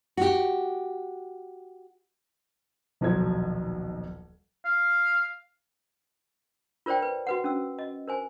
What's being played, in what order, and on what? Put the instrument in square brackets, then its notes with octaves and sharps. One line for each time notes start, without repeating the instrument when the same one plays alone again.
[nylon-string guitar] F#4 G4
[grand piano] D#1 B1 F3 F#3 G#6
[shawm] F5
[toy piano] F4 A#4 C5 D5 G5
B4
F#4 B4 F#5
C#4 E6
D#5
A#4 C5 G#5